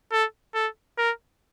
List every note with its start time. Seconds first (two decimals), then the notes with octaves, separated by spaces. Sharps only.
0.12 A4
0.54 A4
0.98 A#4